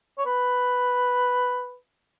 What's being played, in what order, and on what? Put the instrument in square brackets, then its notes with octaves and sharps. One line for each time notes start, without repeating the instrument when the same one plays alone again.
[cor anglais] C#5
B4